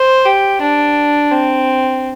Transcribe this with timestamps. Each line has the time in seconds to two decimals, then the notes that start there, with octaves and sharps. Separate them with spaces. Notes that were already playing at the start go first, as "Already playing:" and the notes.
Already playing: C5
0.25 G4
0.61 D4
1.31 C4